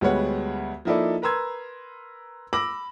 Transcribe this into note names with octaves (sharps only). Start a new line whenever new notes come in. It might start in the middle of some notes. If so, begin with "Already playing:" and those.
D2 G3 G#3 B3 C#5 F#5
F3 A#3 D#4 E4 A4 D5
A#4 B4 A#5 C6 E6 G#6
B5 D6 E6 A#6 F#7